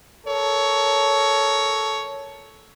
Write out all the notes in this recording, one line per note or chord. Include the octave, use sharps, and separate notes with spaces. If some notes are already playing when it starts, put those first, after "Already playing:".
A4 A#4 C#5